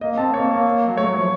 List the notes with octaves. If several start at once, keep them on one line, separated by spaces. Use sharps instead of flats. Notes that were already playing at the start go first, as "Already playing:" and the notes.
A#3 D#5
C4 A5
A#3 C#5
A#3
F#3
A3 C#5
F#3
F3